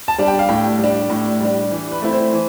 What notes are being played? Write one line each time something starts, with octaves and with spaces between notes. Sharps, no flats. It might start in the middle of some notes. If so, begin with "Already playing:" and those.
A5
G3 D4
G5
F5
A2 G5
G3 D4
A2
G3 D4
E3
B4
A3 C4 E4
C5
E3